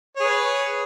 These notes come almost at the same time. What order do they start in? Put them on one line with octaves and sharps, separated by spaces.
C#5 G#4 B4